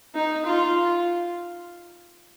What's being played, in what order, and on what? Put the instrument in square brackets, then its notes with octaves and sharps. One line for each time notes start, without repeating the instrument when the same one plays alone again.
[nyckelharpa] D#4
F4